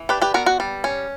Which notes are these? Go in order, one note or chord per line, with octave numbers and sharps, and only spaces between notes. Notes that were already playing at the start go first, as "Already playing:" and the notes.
Already playing: E3
D4 G4 B4
G4 B4
B3 F#4 A#4
F#4
G3
C#4